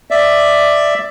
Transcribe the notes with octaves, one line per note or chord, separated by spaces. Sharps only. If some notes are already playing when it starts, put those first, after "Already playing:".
D5 E5